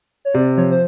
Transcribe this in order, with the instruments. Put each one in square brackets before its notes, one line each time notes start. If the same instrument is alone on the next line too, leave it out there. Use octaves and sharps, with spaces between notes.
[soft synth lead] C#5
[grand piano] C3 [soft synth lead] D5
[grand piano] F3 [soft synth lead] C#5
[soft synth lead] C5